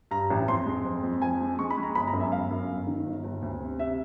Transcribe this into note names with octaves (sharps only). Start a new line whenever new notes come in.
G2 A#5
A1
F2 C6
G#3
F2
F2
F3 G#5
G#3
G#3 C#6
B5
G#3
A#5
G1 B5
A#5
F#2
E5
G1 F5
F#2
G1
D#3
G1
G1
D2
C3
C3 E5